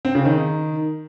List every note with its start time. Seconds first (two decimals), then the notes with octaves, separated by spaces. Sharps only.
0.05 C4
0.15 C#3
0.25 D#3